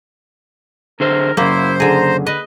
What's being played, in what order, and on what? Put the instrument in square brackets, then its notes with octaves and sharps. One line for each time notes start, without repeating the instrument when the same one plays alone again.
[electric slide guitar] D3 G#4 C5 [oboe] A#4
[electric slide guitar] F#2 C#3 [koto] A#3 [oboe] E4 [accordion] C5
[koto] D3 G#4 [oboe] A#5
[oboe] B4 [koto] D#5